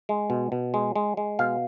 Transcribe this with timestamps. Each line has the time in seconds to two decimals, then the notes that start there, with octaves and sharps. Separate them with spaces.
0.09 G#3
0.30 B2
0.52 B2
0.74 G#3
0.96 G#3
1.17 G#3
1.39 B2 F5